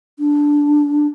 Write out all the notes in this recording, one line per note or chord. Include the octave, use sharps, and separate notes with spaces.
D4